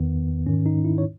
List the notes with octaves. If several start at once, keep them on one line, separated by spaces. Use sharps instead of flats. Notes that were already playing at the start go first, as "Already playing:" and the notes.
Already playing: E2 D#3 B3
G#2 D#3 C#4
D#4
E4
C#5